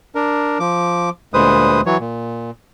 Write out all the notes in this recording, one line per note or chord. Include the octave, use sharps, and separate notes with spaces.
D4 A#4
F3 D6
D2 A#2 G#3 B4 C5 D#6
E3 F#3 C#5
A#2